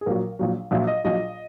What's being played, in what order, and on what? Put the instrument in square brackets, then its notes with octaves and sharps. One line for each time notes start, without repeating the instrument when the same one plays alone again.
[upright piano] G#4
A#1 A#2 F#3 A#4
A#1 A#2 F#3
A#1 A#2 F#3 E5
D#5
A#1 A#2 F#3 D#5